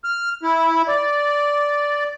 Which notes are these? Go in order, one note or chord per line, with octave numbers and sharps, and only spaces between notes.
F6
E4
D5